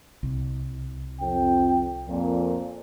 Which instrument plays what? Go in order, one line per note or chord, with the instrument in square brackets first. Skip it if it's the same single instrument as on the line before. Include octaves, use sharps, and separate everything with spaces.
[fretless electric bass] C2
[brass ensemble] F2 C4 G5
F2 A#2